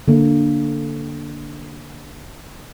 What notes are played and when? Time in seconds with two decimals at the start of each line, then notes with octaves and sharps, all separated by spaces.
0.08 D3 A#3